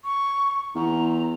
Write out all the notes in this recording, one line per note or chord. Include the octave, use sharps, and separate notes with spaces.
C#6
E2 A#5